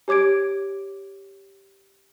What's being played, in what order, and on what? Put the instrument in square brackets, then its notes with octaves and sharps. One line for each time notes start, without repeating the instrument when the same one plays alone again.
[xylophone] G4 C#5 D6 G#6 D7